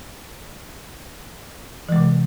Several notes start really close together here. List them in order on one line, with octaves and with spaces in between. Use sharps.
E3 G#3 C3